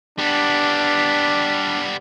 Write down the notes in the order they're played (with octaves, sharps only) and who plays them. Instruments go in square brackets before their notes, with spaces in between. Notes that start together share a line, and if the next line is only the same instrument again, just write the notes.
[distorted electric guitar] G3 B3 [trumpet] D4